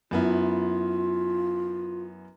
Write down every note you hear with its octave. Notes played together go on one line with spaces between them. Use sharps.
F#2 B3 E4 F4